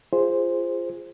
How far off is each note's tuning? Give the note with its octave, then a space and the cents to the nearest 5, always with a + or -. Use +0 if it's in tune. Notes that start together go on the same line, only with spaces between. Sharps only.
F4 -15 G#4 -20 C5 +0